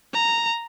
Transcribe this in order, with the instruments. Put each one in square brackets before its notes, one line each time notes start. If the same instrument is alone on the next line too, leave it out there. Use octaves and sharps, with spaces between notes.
[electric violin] A#5